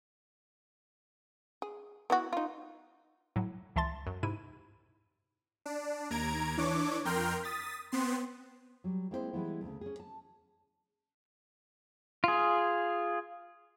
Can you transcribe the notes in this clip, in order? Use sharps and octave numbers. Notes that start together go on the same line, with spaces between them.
G#4
B3 E4 F#4
D#4 F4
A2 F#3
C#2 E3 E5 A5 C6 A6
F#2
G#2 C3 E4 D#7
D4
D#2 A#5 G#6 D7
E3 D4 C#5 D6
F2 A#4 G5 A#5 C6 F6
D#6 A6 B6
B3 C4 C6
F#3 G3
G#3 A#3 C4 E4 A4 C5
E3 G3 G#3 B3 E4
D2 C#3
C#4 G#4
A5
F4 G#4